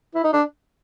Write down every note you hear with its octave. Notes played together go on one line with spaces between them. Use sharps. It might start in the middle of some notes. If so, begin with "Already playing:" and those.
E4
D#4
D4